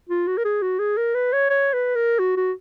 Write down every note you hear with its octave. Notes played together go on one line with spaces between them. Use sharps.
F4
F#4
A#4
G#4
F#4
G#4
A#4
B4
C#5
C#5
B4
A#4
F#4
F#4